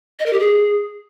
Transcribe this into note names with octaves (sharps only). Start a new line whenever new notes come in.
D#5
A#4
G4
G#4